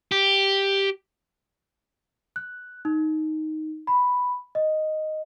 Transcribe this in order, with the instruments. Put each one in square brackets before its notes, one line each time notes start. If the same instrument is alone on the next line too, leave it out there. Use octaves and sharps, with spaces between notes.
[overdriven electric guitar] G4
[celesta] F#6
D#4
B5
D#5